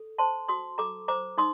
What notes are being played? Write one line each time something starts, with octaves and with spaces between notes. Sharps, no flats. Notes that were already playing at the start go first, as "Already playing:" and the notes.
Already playing: A4
C5 A5 C6
F#4 C6 D#6
A4 A#5 D6
C5 A#5 D6
D#4 C6 D#6